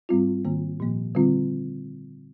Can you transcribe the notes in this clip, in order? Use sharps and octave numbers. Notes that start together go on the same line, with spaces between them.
G#2 G3 C4 F4
G#2 D#3 A#3
A#2 F3 A#3
D3 G3 C4 F4